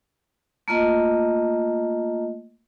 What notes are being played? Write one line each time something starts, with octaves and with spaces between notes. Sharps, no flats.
A3 A#3 F4 D#5